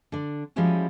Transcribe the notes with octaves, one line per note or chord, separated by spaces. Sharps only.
D3 D4
F3 G3 G#3 C#4 E4 F#4